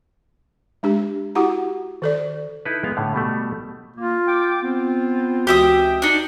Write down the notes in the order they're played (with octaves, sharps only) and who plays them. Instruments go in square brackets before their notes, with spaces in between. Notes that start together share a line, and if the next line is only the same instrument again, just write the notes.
[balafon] G#3 D4 G4
E4 F#4 G4 F#5 A#5
D#3 A4 D5
[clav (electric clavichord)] D#4 E4 A4 B4
G#3 B3 F5
A2 D3
B2 G3 A3
[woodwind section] A#3 [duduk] F4
[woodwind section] G5 D6
[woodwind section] B3 F4 [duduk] C4
[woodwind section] C#2 E3 G5 [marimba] F#4 [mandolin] G4 E5 D#6
[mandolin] D4 D#4